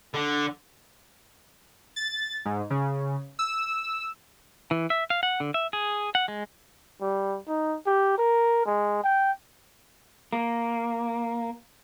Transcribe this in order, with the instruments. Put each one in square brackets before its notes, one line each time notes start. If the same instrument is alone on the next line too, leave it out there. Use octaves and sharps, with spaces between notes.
[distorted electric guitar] D3
[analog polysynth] A6
G#2
C#3
E6
[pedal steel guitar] E3
E5
F5
F#5
D3
E5
G#4
F#5
G#3
[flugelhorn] G3
D#4
G4
A#4
G#3
G5
[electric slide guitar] A#3